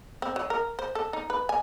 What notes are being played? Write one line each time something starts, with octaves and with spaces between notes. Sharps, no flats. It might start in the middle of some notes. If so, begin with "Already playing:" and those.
C4
F#3
A#4
C5
A4
D#4
B4
G#5